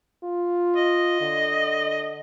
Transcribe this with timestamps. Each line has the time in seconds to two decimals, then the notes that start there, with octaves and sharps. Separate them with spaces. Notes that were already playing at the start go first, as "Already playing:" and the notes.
0.23 F4
0.76 D#5
1.21 D3